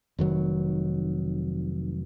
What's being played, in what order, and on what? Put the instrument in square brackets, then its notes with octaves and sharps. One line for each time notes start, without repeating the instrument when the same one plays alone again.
[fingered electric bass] F1 D#3 F#3